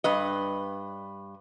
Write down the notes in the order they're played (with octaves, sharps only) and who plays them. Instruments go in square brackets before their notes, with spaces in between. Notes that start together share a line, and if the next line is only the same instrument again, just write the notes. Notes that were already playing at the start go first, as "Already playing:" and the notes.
[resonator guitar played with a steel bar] G2 B4 D#5